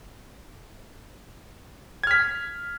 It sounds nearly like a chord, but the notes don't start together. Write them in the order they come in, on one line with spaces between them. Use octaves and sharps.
G#6 F6 B6